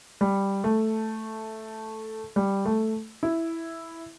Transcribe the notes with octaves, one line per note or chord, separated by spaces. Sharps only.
G3
A3
G3
A3
E4